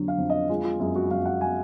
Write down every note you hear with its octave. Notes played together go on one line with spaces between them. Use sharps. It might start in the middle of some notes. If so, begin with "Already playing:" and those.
Already playing: F2 D3 F#3
F5
F2
D#5
G#3 F4
F4
F#2 G#4
F#4
F#2 F5
F#5
G#3 G#5